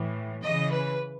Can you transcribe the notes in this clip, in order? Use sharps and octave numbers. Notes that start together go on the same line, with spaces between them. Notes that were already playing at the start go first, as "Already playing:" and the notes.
Already playing: A2 E3
C#3 E3 D#5
B4